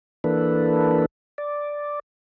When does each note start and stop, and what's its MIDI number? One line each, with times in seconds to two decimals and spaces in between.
0.24 1.06 52
0.24 1.06 58
0.24 1.06 62
0.24 1.06 69
0.24 1.06 71
1.38 1.99 74